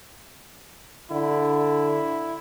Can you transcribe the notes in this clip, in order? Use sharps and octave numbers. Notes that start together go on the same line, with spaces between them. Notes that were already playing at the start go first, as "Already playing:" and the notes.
D3 E4